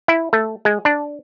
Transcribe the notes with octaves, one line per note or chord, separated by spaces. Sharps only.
E4
A3
G#3
D4